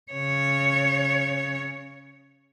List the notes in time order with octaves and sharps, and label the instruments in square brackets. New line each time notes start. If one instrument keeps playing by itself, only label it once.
[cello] C#3 C#5